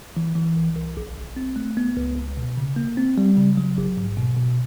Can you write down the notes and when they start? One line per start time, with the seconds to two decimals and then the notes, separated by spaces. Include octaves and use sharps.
0.17 E3
0.36 E3
0.56 C2
0.76 C2
0.97 A#1
1.17 A#1
1.36 C4
1.56 A3
1.77 B3
1.97 C#2
2.16 C#2
2.37 B2
2.57 C#3
2.76 A#3
2.97 C4
3.18 G3
3.37 C#3
3.57 F#3
3.78 A1
3.97 G#2
4.17 B2
4.37 B2